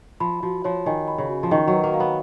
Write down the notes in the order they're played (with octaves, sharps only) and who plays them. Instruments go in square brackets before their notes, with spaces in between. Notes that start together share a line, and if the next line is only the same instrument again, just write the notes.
[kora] F3 [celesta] B5
[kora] F3 [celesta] F#4
[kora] F3 [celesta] C#5
[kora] D#3 [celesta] G#5
[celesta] B5
[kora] C#3
[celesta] F#4
[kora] F3
[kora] D#3 [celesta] C#6
[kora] F#3
[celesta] B4
[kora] A#3
[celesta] F5
[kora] B3